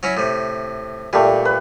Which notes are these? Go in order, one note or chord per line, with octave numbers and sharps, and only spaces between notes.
F#3 C#4 E4
A2 C3
A#2 G3 A3
B4